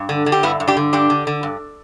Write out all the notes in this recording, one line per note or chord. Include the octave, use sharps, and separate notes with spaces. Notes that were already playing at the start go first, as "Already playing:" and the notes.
Already playing: G2
D3
D3
G4
G2 B3 E4
G2
D4 G4
D3
G2 D4 G4
D3
D3
G2